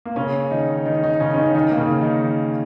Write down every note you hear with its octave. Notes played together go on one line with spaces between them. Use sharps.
A#3
C#3 C#4
D#3 D#4
D#3 D#4
D#3 D#4
C#3 C#4
C#4
D#3 D#4
D#3 D#4
A#3
C#3 C#4
D#3 D#4